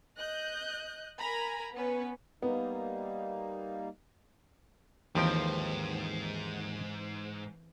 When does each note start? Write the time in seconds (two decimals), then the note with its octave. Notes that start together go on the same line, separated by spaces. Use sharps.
0.17 D#5 F#6 G6
1.18 A#4 G#5 A#5 B5
1.73 B3 C#4 B4
2.42 G3 A#3 B3 D#4
5.15 D#2 G#2 E3 F3 C4 G5